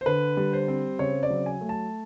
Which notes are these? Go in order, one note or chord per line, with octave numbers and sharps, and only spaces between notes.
C5
D3 B4
G3
C5
C4
C#3 C#5
D5
F#3
G#5
A3
A5